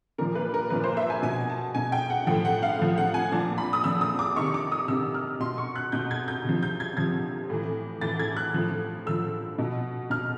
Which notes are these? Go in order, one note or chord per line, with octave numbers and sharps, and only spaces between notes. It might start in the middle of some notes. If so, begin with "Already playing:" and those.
A#2 F3 A#4
B4
A#4
A#2 F3 B4
C5
E5
G#5
B2 G#5
A5
B2 G#5
G5
F#5
A2 F3 G5
F#5
F5
A2 F3
F#5
G#5
A#2 F3 A5
B5
D#6
A#2 F3 E6
D#6
D6
C3 D#3 C#6
D6
D#6
C3 D#3 E6
F6
B2 C6
C#6
F#6
B2 G6
G#6
G6
C3 F3
G6
G#6
C3 F3 G#6
A2 E3
A2 E3 A6
G#6
F#6
A2 F3
A2 F3 E6
B2
B2 F6